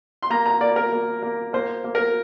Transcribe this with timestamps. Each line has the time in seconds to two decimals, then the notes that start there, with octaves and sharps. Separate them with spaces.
0.22 C6
0.30 A#3 A#5
0.46 A#5
0.61 A#3 D5
0.76 A#4
0.92 A#3
1.23 A#3
1.53 A#3 C5
1.84 A#3
1.95 A#4